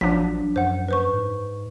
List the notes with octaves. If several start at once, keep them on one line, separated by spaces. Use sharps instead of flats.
A1 F3 F#3 D4 B6
F#2 C5 F#5
B4 C5 C#6
G#2